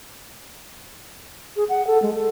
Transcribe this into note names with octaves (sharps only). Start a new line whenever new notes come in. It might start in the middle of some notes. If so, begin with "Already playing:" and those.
G#4
F#5
A4
G#3
A4